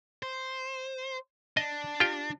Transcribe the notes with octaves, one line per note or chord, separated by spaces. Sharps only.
C5
D4 D#5
F4 G4 G5